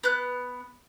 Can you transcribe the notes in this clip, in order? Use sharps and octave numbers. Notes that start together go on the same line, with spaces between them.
B3 F#6